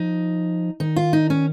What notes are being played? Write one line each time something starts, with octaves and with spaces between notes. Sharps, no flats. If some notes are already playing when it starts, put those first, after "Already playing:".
Already playing: F3 D#4
D#3 D#4
F4
D#4
C#4